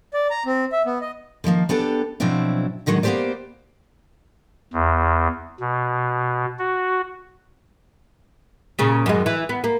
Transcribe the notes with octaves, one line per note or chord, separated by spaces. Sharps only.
D5
A#5
C4
E5
B3
D#5
D3 D#3 F3 A#3
B3 D4 G4 A4
B2 F3 F#3 C4 D4 E4
A2 D3 D#3 F#3 G#3
A#3 B3 D#4 G4 C5 D5
E2
B2
F#4
A#2 C#3
F#2 D#3 G#3
E3
B3
A#3